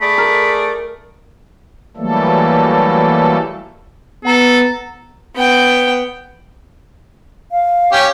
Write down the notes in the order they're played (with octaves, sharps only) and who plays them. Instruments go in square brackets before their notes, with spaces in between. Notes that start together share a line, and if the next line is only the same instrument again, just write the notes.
[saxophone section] A3 G#4 D5 [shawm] B5
[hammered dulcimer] A#4
[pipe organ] E3 F#3 G3 A3 A#3 A4
[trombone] B3 [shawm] A4 [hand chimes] F#5 A#5
[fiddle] B3 G5
[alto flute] F5
[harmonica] C#4 G4